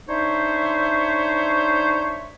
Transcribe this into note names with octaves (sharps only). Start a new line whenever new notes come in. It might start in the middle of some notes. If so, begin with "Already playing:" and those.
D4 D#4 C5 C#5 E5